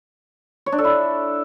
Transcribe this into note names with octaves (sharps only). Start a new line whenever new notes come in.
C#5
D4
A4
E4